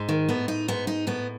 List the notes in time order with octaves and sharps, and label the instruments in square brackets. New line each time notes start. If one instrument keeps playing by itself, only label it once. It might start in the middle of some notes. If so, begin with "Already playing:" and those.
Already playing: [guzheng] G#2
[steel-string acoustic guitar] D#3
[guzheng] A2 [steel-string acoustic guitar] B3
[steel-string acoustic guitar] D#4
[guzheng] G#2 [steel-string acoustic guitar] B3
[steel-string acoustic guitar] D#4
[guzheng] A2 [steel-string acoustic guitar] B3